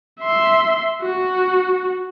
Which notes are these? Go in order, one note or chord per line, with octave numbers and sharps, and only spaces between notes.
E5 C6
F#4